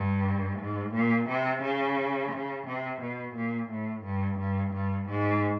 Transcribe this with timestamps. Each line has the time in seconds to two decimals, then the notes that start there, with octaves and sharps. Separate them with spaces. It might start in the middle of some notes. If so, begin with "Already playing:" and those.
Already playing: G2
0.59 G#2
0.94 A#2
1.29 C3
1.62 C#3
2.32 C#3
2.66 C3
3.01 B2
3.36 A#2
3.70 A2
4.05 G2
4.39 G2
4.74 G2
5.09 G#2